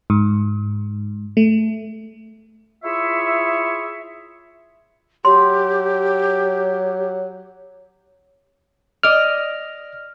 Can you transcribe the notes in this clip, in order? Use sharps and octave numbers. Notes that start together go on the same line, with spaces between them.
G#2
A3
E4 F4 G#4 C#5 E5
F#3 G4 C6
D5 D#5 F6